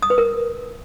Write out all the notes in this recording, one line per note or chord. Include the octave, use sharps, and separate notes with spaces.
D#6
B4
A#4